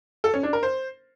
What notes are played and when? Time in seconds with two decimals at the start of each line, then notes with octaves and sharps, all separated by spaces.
0.24 A4
0.34 C#4
0.43 D4
0.53 A#4
0.63 C5